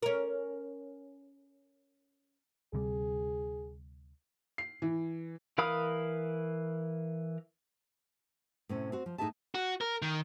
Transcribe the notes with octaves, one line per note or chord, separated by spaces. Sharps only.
C#4 A#4
D2 C3 G3 G#4
C7
E3
E3 A#4 F5 B5 D#6
A2 C3 C#4
C4 F#4
F3
A2 D#4 G4 G#4 E5 A5
F#4
A#4
D#3